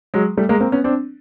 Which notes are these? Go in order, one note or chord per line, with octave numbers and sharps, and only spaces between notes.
F#3 G#3
G3 A3
G#3 A#3
A#3 C4
B3 C#4
C4 D4